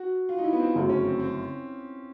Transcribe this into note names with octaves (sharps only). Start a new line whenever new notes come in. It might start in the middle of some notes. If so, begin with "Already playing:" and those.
Already playing: F#4
F4
D#4
E4
B3
C4
G1 F#2 C#3 F#3 A3 C4
C#4
C4
C4